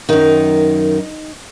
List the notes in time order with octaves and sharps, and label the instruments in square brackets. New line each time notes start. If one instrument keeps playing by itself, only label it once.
[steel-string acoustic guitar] F#2 D#3 D#4